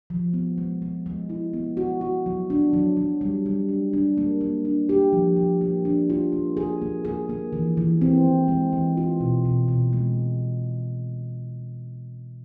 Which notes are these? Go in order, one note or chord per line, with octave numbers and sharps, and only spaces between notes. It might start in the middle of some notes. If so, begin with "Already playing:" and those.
F3
B3
G#3
G#3
G#3
E4
B3
F#4
F#4
F#3
D4
F#3
F#3
G3
G3
D4
D4
A#3
A#3
D4
G4
F3
F3
A#3
D4
F4
A#3
G#4
A#3
G#4
A#3
E3
E3
C4
E3
G#3
E3
F4
B2
B2
B2
G#3